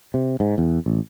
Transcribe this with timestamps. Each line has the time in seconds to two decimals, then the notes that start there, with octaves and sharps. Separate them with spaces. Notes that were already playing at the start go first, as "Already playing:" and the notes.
0.14 C3
0.40 G#2
0.58 E2
0.86 A1